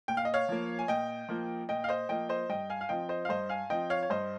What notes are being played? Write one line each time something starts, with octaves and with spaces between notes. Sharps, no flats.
A#2 G5
F5
D#5
C#5 F5
F3 A#3
G#5
A#2 D#5 G5
F3 A#3
A#2 D#5 G5
F5
C5 D#5
F3 A#3 D#5 G5
C5 D#5
G2 D#5 G5
F5 G#5
F5
F3 C4 D#5 G5
C5 D#5
F5
G2 C5 D#5
F5 G#5
F3 C4 D#5 G5
C#5 F5
C#5
G2 C5 D#5